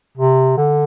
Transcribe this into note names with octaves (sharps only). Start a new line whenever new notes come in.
C3
D3